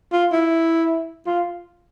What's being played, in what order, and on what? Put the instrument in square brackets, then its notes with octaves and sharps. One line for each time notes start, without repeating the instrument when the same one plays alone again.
[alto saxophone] F4
E4
F4